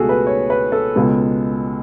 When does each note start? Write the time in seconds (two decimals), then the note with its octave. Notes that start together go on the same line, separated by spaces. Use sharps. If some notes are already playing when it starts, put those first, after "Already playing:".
Already playing: C#2 B2 A3 F#4 G#4 A4
0.09 B4
0.27 C#5
0.50 B4
0.72 A4
0.96 C#2 B2 G#3 B3